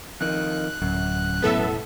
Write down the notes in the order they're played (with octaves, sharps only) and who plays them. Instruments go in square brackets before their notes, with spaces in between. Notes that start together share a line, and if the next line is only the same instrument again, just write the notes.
[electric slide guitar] F2 D#3 [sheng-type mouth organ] F#6
[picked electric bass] D1 [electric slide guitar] F#2
[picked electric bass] E1 A2 [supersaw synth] B3 A4 E5